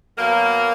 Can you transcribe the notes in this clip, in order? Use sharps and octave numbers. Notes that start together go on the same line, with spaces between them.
B2 F#3 A#3